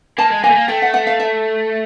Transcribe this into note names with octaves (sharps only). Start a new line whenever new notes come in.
A#3 A5
G#3
A#3 G#5
A3
A#3
A3 G5
F#5
F#5
F5
E5